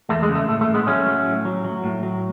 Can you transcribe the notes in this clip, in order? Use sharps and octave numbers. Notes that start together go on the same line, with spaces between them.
E2 A3
G#3
C#3
A3
A2 A3
A3
A2
G#3 B3
F#3 A3 C#4
F#3
A2
F#3
F#3
A2
F#3